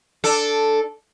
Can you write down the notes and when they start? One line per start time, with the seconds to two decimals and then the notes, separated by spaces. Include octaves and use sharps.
0.24 D4 A4